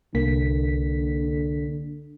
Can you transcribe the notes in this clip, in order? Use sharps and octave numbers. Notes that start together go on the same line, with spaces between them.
C2 D3 A#3 B6